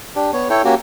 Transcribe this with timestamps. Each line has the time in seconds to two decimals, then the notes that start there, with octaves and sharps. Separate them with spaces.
0.16 D4 G4
0.33 B3 C#5
0.50 E4 A4 C#5 G5
0.65 A#3 C#4 F#4 G4